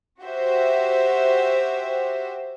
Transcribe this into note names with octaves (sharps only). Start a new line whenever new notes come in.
F#4 G4 C5 E5